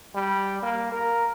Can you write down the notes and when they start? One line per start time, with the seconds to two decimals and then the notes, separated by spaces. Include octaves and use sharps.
0.15 G3
0.63 A#3
0.92 A#4